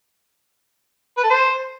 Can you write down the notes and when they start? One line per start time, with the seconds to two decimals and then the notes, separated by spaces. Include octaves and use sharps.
1.17 B4
1.23 A4
1.30 C5